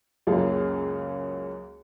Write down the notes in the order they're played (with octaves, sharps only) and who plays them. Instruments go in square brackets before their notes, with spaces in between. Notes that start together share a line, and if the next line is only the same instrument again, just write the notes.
[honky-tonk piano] C#2 F#2 A#3 F4 G#4